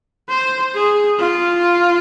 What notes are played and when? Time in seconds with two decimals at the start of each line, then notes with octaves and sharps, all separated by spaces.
0.29 C5
0.75 G#4
1.19 F4